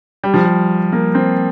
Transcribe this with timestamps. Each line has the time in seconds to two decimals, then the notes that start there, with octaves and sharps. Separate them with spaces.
0.24 G3
0.34 F3
0.44 G3
0.92 A#3
1.15 C4